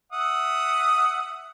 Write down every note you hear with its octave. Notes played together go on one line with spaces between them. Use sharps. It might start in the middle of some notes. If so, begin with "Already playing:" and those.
E5 F#5 D#6